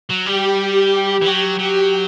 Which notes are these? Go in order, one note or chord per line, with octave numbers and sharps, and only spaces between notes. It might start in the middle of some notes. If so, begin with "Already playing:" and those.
F#3
G3 G4
G4
E3
F#3
F#3 G4